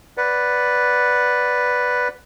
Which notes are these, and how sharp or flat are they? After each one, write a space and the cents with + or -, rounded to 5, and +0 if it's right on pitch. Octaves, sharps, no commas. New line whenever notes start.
B4 +0 D5 -5 F#5 +0